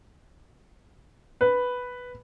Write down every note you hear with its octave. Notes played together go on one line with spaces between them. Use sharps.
B4